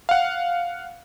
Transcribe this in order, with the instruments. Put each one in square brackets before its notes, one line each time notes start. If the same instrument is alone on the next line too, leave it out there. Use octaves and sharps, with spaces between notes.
[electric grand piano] F5 F#5